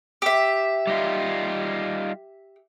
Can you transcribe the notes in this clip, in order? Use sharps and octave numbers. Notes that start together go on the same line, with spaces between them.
G4 E5
G3 D#4 F4